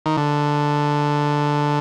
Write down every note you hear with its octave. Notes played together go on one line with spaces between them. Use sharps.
D#3
D3